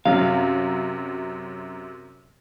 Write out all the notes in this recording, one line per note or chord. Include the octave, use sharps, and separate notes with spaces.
F#2 C3 F#3 F5